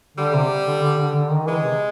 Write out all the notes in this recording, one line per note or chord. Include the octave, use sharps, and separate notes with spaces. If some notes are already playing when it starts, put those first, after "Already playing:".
D3 G3
C3
D3
D3
D3
D3
D#3
E3 G#3
C3